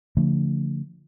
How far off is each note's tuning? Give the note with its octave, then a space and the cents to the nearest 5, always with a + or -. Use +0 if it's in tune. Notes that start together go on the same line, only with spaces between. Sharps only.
D3 -35 F3 -15 A3 +25